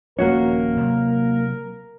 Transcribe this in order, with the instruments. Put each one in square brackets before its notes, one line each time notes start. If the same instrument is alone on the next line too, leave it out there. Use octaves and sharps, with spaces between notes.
[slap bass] D#1 F3 C#4 [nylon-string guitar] A#3 F#4 C#5 [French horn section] A#4
[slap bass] C3 F#3